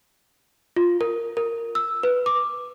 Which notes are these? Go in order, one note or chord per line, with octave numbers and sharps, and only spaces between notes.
F4
A#4
A#4
E6
B4
D6